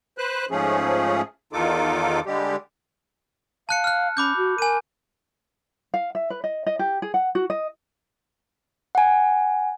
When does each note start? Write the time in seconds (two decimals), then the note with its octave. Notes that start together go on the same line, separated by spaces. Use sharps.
0.18 B4 C5 F#6
0.51 G#2 F3 A3 C#4 G#4
1.53 E2 D#3 D#4 F4 A4 D6
2.26 D3 G3 G#3 G4
3.69 F5 A5 F#6 C#7
3.84 F6 F#6
4.17 C#4 B5 D6 G6
4.37 F#4
4.58 A#4 G#5 D#7
5.94 F5
6.15 E5
6.30 B4
6.44 D#5
6.66 D#5
6.79 G4
7.02 G#4
7.14 F#5
7.35 F#4
7.50 D#5
8.95 F#5 G#5